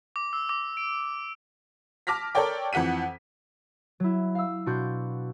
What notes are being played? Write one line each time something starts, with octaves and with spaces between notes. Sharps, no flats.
D6
E6
D6
D7
A5 D6 F6 A#6 B6
A4 A#4 C#5 D5 G5
F2 E3 F#5 B6 D#7
F#3 E4
F5 E6
B2 D4 F#4 C6 G6